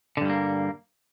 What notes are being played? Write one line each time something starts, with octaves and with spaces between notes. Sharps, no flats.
G2 D3 G3 A#3